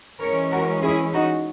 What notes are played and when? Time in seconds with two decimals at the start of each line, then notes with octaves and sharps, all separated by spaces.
0.20 E3 G#3 C#4 A#4 C#5
0.51 F#4 A#4
0.82 E4 G#4
1.13 D#4 F#4